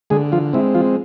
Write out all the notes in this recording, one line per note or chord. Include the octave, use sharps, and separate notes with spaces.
D3 G#3 G#4
F3 F4
G#3 C4 E4
F3 F4